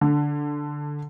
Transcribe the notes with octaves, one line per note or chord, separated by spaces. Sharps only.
D3